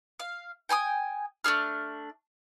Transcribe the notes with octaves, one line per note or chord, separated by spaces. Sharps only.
F5
G5 G#5 C6 D#6
A3 D4 G#4 F6